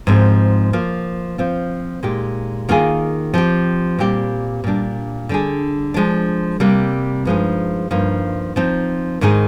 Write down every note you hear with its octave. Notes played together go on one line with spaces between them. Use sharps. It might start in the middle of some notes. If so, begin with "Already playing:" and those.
G#2 F3 C4
F3 A#3 F4
F3 C4 F4
A#2 G#3 D#4 G4
D#3 A#3 F4 G#4
F3 C4 G4
A#2 G3 C4 G4
A#2 G3 D4
D3 G3 D4 G#4
F3 G#3 D4
C3 G3 A#3
G2 F3 G#3 D#4 G#4
G2 F3 A#3 D#4
F3 C4 D#4
G#2 D#3 G#3 D#4 G#4